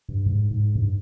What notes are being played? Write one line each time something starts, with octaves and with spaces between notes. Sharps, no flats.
G2
G#2
G#2
G2